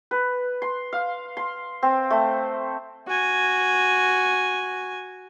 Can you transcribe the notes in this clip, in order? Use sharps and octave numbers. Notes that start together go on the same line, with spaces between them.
B4
C6
F5
C6
C4
A3
F#4 G#5